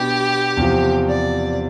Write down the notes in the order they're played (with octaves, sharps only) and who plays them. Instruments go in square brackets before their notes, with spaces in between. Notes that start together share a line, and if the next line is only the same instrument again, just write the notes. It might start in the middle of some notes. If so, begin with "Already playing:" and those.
Already playing: [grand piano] B2 B3 D4 [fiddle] G4
[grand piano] E2 C3 F3
[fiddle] D5